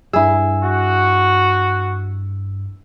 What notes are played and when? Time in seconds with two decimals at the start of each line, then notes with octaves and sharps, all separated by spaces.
0.13 G2 E4 G#4 E6
0.62 F#4